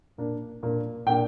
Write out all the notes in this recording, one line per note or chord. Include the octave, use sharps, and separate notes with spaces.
A#2 A#3 D4
A#2 A#3 D4
A#2 A#3 D4 G5